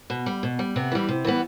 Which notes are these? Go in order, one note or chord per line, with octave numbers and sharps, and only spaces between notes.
B2
G3
B2
G3
C3 B3
E3 G3
C3
E3 G3 B3